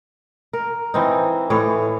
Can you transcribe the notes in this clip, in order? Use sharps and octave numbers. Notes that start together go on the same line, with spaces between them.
A#4
E3 C4 D#4
A2 E3 C#5